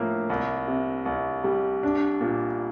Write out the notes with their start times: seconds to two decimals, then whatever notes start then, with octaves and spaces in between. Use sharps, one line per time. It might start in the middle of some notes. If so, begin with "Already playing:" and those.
Already playing: A2 F3 A#3
0.30 C2
0.68 C3
1.06 C2
1.44 G3
1.83 D4
2.21 A#2